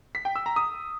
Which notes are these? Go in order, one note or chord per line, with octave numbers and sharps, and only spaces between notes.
B6
G5
E6
A#5
D#6